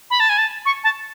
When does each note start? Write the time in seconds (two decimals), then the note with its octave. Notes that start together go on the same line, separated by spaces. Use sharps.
0.10 B5
0.20 A5
0.29 G#5
0.38 A5
0.65 C#6
0.84 A5